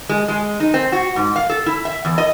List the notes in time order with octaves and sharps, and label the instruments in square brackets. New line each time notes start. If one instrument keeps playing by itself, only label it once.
[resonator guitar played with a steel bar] G#3
G#3
D#4
C4
F#4
G#2
F5
A4
E4
E5
E2
D#5